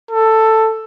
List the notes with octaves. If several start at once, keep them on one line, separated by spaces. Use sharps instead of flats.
A4